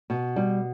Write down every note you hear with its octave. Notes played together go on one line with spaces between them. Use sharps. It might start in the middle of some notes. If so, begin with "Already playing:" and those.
B2
G3